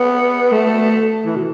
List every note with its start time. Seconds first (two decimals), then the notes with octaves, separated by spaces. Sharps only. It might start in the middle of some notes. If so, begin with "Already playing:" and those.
Already playing: B3
0.52 A3
1.26 E3
1.36 B2